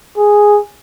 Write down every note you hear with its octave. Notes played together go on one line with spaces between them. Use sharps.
G#4